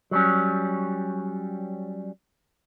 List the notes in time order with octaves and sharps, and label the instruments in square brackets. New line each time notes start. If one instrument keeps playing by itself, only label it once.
[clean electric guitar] F#3 G3 C#4